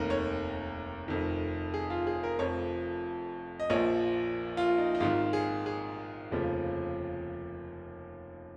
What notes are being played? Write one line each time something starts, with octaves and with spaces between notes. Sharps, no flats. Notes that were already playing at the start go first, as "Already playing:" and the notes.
Already playing: F1 D#2 D#3 A#4
C#5
F1 F2 D#3
G#4
F4
G#4
A#4
F1 F2 F3 C#5
D#5
A#1 A#2 F3 C#5
F4
D#4
D#4
G#1 G#2 D#3 F4
G#4
G#4
F1 D#2 C#3 F3